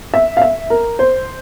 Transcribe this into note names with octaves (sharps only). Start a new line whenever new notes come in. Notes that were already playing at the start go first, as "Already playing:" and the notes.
E5
F5
E5
A#4
C5